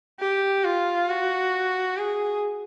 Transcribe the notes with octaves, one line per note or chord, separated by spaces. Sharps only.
G4
F4
F#4
G#4